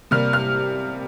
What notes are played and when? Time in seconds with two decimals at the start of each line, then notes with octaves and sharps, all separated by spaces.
0.11 C3 G3 A#3 F6
0.33 F6